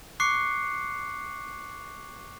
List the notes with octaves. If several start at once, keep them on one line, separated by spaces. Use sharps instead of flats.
C#6 D6 F#6 C7 C#7